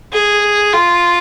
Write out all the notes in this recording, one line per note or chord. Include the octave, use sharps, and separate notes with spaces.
G#4
F4